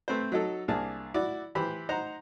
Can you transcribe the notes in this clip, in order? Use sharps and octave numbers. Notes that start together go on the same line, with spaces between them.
A3 C4 B4 C5
F#3 D#4 A4
C2 A#3 D4 G#4 A5
E4 F#4 D5
E3 G4 C5 B5
D#4 C5 F#5 A#5